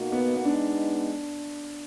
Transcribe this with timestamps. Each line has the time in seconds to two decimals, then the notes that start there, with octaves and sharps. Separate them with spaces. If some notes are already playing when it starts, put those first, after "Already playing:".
Already playing: B2 A#3 D#4 F#4
0.12 B3
0.35 B3
0.45 G#3 B3 D4 D#4